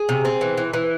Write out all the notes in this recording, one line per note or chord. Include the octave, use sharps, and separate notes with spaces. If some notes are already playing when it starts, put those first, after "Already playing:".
Already playing: G#4
C3
C4
E3
E3
E3